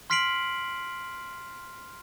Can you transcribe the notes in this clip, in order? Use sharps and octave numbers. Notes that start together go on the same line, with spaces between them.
C6 F6 B6 C7 D7 F#7